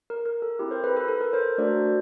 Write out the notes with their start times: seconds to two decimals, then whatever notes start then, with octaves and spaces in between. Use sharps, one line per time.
0.10 A#4
0.26 A#4
0.42 A4
0.59 C4 E4 G4
0.71 A#4 C5
0.84 A4 B4
0.96 A4 B4
1.08 A4
1.21 A#4
1.33 A#4 C5
1.58 A3 D4 F#4 A4 C5 D5